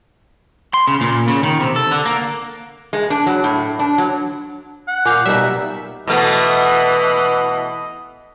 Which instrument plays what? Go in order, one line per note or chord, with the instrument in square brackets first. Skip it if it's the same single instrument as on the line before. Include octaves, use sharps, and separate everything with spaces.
[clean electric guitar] C6
C#3
A#2
C#3
D#3
C3
A4
D3
A#3
[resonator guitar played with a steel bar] G#3
D4
F#3
A2
D4
F#3
[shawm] F#5
[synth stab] A#2 F5 [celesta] G#5 D6 G6
[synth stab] B2 E5 [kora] G3 A#3 D#4 [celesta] F#6
[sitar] B2 A3 B3 [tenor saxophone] E3 [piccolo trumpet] D#5